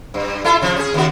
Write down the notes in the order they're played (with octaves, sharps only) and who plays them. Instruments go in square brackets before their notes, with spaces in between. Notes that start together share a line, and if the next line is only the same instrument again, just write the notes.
[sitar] G2
E4 F4 A4
C#3 F3
C#4 G#4
D#2 C#3 F#4